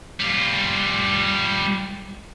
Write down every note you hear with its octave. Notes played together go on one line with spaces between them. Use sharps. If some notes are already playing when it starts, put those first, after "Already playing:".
G3 F4